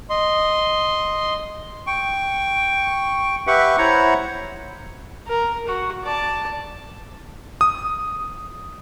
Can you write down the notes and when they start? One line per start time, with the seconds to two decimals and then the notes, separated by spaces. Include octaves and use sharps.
0.10 D#5 C6
1.87 G5 C#6
3.47 G4 B4 E5 F#5 C#6
3.78 E4 C5 C#5 F#5 A#5
5.27 A#4
5.67 F#4
6.03 D5 A5
7.61 D#6